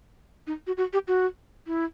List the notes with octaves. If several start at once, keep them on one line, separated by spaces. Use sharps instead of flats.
D#4
F#4
F#4
G4
F#4
E4